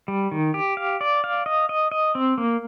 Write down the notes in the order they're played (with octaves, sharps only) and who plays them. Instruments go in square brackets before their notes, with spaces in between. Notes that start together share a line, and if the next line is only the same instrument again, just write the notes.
[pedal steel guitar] G3
D#3
G4
F5
D5
F5
D#5
D#5
D#5
C4
A#3